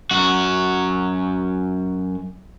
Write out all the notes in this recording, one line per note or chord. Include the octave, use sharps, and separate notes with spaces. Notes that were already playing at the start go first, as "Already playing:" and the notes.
F#2 F#4